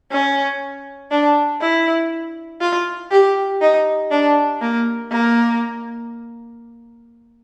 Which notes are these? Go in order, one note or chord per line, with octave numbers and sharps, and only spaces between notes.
C#4
D4
E4
F4
G4
D#4
D4
A#3
A#3